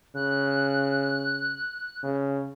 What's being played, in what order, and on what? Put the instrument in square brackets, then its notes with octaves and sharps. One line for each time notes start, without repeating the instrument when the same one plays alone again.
[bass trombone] C#3 [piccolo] F#6
[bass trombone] C#3